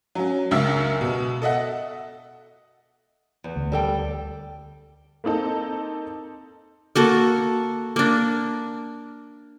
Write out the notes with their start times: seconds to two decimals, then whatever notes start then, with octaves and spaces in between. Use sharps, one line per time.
0.15 F#3 C#4
0.51 C#2 F#2 A#4 E5 F5 E6
1.01 B2
1.42 A4 D#5 E5 F#5
3.44 E2
3.56 D2
3.72 G3 A4 G5
5.24 A#3 C4 D#4 A4
6.96 A#3 F#4 A4
7.96 A#3 D4